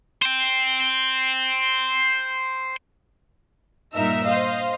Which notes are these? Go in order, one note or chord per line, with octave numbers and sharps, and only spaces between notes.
C5 G5
G2 A#2 D#4 A#4 E5 E6
C5 D#5 F5